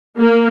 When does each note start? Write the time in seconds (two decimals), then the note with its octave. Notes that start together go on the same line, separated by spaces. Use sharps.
0.18 A#3